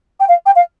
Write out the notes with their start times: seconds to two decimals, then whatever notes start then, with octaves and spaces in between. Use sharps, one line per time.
0.20 G5
0.29 F5
0.46 G5
0.56 F5